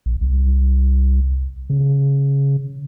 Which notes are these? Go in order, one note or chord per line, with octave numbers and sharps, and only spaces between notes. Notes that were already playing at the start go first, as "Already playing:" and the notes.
A#1
C2
C#3